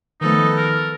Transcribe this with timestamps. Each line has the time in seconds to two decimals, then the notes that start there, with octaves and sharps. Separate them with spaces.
0.21 D#3 F3 A3 B3 D#4 A4
0.57 A#4